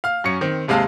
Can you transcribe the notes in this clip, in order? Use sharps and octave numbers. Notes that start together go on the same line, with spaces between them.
F5 F6
F#2 C#4 C#7
D#3 C4
D#2 C3 G#3 F5 A5